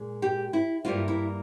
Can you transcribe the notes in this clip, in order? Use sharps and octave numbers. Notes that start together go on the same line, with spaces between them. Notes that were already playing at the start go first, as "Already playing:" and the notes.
Already playing: A#2 G#3
G4
E4
G2 G3 A#3 C#4 E4 F4
E4